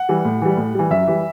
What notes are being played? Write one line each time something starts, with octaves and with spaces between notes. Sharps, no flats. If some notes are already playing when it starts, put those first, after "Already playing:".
Already playing: F#5
E3 G3
A2
E3 G3
A2
E3 G3
F#2 E5
E3 G3